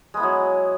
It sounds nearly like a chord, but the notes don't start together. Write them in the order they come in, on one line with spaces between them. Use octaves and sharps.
G#3 B3 E4 F#3